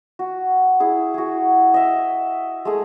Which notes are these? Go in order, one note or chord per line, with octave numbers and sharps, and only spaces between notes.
F#4
E4 G#4
F#4 G#4
D#5 E5
G#3 A3 G#4